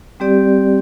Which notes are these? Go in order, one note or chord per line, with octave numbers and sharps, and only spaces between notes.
G3 C4 G4 D5